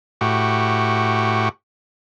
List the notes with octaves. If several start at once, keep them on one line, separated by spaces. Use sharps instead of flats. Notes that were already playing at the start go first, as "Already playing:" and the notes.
A2 F#4 G4